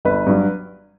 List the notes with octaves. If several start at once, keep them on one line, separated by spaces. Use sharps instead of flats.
G1 B4
G2 F#3